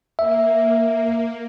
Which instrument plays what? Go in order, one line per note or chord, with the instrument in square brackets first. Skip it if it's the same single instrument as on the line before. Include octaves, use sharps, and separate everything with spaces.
[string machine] A#3 [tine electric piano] E5